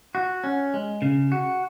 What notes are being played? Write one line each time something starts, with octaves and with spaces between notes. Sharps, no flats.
F#4
C#4
G#3
C#3
F#4